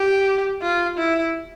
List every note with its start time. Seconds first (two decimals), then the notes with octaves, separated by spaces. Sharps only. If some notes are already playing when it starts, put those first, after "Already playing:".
Already playing: G4
0.62 F4
0.98 E4